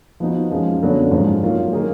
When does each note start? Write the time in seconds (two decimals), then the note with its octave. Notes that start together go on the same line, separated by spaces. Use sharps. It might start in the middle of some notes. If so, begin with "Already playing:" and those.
0.20 F3 B3 D#4 F#4
0.51 F#2 F3 G#3
0.82 F#2 D3 F#3 B3 D4
1.11 G#2 F3 G#3 D4 F4
1.43 F#3 A#3 F4
1.73 D#3 A#3 D#4 G#4